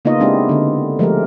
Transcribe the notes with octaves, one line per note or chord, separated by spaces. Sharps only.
C#3 A#3 B3 D#4 F4 D#5
G#3 C4 D4 E4 G4
D3 B3
F3 G#3 A3 G4 A#4